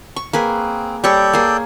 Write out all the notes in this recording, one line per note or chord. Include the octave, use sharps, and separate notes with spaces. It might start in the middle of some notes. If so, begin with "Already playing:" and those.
C#6
A#3 C4 G#4 B4
G3 A4 C#5 D5 G5 C#6
A#3 G#4